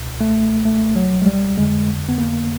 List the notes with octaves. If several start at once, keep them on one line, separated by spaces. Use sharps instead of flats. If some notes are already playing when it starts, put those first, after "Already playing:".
Already playing: C#2 B2
A3
A3
F#3
G#3
G3
F2 D3 G#3
B3
A#3